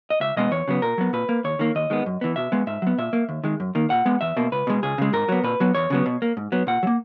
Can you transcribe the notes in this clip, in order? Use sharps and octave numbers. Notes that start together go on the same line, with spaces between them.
D#5
C#2 E5
B2 G#3 B3 D#5
E2 C#5
C#3 F#3 B3
A#2 A#4
F#3 B3
A#2 B4
A#3
D#2 C#5
D#3 A#3
D#2 D#5
D#3 G#3 B3
F#2
E3 B3
B2 E5
G#3 B3
G#2 E5
F#3 B3
A#2 E5
A#3
D#2
D#3 G#3
F#2
D#3 A#3
A#2 F#5
G#3 B3
E2 E5
B2 A#3
C#2 B4
B2 G#3
C#2 G#4
C#3 G#3
G#2 A#4
F#3 B3
A#2 B4
F#3 B3
E2 C#5
C#3 F#3 B3
B2
A#3
G#2
F#3 B3
A#2 F#5
F#3
A#3